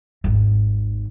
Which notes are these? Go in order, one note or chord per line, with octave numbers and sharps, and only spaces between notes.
G#1 D#2